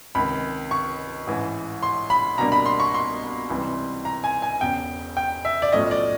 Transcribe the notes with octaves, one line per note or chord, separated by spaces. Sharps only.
C#2 C3 D#3 B5
C#6
A1 G#2 E3
C6
B5
C2 B2 G3 A#3 D4 A#5
B5
C6
C#6
C6
C#2 C3 E3 G3
A#5
G#5
G#5
E1 E2 C#3 G5
G5
E5
D5
B1 A2 F3 A3 C#4 D#5
D5